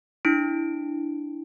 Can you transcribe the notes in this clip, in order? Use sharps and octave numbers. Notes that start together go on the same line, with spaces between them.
D4 E4 D7